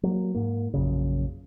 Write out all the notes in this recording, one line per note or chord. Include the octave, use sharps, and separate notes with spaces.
F#3 A#3
G#2 A#3
A#1 F#2 C#3